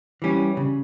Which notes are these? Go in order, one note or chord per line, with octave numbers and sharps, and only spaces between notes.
E3 G3 C#4
C#3